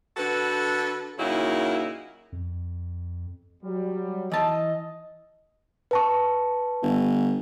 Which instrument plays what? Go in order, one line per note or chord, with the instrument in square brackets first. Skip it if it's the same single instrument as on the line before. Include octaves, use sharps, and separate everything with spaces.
[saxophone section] D3 F#4 A4 B4
A#2 C#3 F#3 A#3 D#4 E4
[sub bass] F2
[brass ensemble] F#3 G3
[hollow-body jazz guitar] E3 A5 [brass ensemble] D#5
[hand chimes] B4 A5 C#6
[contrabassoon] G1